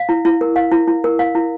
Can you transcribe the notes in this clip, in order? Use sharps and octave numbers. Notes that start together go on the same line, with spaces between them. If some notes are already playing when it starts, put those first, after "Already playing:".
Already playing: F5
E4
E4
A#4
F5
E4
E4
A#4
F5
E4